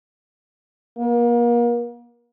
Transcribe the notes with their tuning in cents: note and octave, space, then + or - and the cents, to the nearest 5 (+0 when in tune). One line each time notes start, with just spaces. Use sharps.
A#3 +35